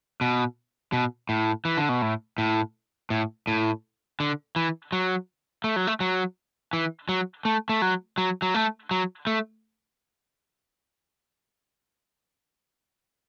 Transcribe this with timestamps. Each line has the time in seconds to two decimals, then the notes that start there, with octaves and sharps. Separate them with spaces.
0.21 B2
0.93 B2
1.29 A2
1.65 E3
1.77 D3
1.89 B2
2.02 A2
2.38 A2
3.10 A2
3.47 A2
4.20 D3
4.56 E3
4.92 F#3
5.64 A3
5.76 F#3
5.87 A3
6.00 F#3
6.73 E3
7.09 F#3
7.45 A3
7.69 A3
7.82 F#3
8.18 F#3
8.42 F#3
8.54 A3
8.91 F#3
9.27 A3